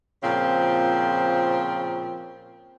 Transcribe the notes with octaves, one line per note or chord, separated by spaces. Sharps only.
A#2 C#3 F3 C4